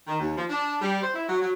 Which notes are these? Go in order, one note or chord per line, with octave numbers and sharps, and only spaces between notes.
D#3
D#2
F3
D4
G3
C5
E4
F#3
F#3